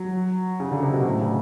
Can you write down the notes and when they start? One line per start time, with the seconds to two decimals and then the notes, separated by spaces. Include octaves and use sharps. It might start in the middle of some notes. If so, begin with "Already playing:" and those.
Already playing: F#3
0.60 C#3
0.71 D3
0.83 C3
0.94 B2
1.05 A2
1.21 C#3